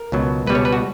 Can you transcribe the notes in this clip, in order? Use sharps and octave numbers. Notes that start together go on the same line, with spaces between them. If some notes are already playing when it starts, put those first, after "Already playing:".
Already playing: A#4
C#2 B2 F#3
C#2 B2 G3 B4
C#5
B4
F#4